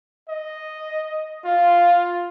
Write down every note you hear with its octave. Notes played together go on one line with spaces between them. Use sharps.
D#5
F4